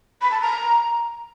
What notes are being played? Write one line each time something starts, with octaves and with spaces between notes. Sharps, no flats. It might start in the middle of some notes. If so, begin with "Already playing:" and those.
B5
A5
A#5